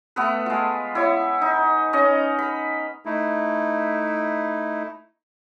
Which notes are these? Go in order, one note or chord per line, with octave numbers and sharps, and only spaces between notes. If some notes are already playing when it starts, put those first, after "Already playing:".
A3 B3 B4
G#3 F4
E4 C#5
D#4
C#4 D#5
B5
A3 D#4 E4